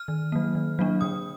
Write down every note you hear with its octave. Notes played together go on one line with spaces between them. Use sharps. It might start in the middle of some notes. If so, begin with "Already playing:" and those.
Already playing: F6
D#3
F#3 A#3
D#3
F#3 A#3 D4
D3 D#6